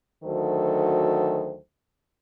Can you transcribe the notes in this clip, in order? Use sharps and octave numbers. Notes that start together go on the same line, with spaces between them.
D2 D#3 F#3 A4 C5